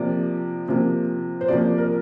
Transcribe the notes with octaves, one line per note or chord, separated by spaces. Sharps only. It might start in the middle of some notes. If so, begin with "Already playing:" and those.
Already playing: C3 F3 A#3 D5
C3 F3 A#3
C5
C3 F3 A#3 D5
A#4